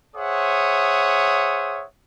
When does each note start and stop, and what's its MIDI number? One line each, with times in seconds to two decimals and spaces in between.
0.16 1.85 68
0.16 1.85 72
0.16 1.85 73
0.16 1.85 76
0.16 1.85 78
0.16 1.85 87